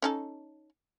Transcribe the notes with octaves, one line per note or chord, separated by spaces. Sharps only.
C#4 D#4 A4